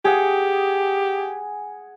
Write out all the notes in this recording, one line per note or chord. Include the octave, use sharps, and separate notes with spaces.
G4 G#4 F#5